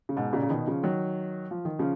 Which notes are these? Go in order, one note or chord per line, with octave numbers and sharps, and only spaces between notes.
C#3
G#2 B2
A#2 C#3
C#3
B2 D#3
C#3 F3
D#3 F#3
F3
D#3
C#3 F3